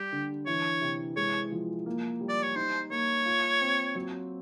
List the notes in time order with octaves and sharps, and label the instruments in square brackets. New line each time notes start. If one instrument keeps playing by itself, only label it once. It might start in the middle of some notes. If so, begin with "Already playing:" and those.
Already playing: [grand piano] G3 [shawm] G4
[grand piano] D3
[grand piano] E3 [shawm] C#5
[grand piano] C3
[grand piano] G#3 [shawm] C#5
[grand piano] F3
A#3
G3
[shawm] D5
C#5
[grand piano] D#4 [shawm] C5
[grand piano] A#3 [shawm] C#5
[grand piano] F4
C4
F#3